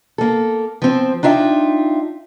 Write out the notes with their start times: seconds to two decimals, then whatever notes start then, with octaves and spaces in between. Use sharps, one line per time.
0.18 A#3 A4
0.82 F3 C4
1.23 D4 D#4 F4 E5 G5